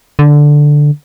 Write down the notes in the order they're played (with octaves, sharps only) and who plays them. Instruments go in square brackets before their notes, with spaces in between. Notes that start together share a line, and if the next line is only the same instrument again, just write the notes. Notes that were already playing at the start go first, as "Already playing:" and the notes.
[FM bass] D3